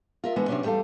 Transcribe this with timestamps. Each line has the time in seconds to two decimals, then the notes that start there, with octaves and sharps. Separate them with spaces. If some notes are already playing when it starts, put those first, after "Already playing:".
0.24 F4 A#4 E5
0.36 D3 E3 G#3 B3
0.48 C3 F#3 G#3 B3 C#4 D4
0.64 E2 G3 A3 A4 F5